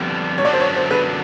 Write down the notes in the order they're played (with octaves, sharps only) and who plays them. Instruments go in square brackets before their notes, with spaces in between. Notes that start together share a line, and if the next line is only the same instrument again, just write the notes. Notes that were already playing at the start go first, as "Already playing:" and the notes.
Already playing: [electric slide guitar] F2 D3 G3 B3 D4
[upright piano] C#5
[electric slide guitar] F#2 D3 F#3 B3 D4 [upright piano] D5
[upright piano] C5
C#5
C5
B4